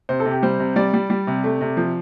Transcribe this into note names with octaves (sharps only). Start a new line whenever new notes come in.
C3 C5
A4
C3
G4
G3 C5
C3
G3 D5
G3
G3
C3
A3
C3
F3